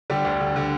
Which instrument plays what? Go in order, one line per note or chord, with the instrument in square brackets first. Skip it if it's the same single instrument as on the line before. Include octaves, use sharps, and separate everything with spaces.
[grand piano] D3 G3 G4
D2
D3
D3